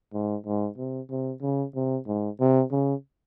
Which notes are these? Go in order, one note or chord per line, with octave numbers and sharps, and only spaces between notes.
G#2
G#2
C3
C3
C#3
C3
G#2
C3
C#3